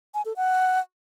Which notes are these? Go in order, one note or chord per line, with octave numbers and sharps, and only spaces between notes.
G#5
A4
F#5